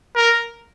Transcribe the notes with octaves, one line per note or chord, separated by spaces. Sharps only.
A#4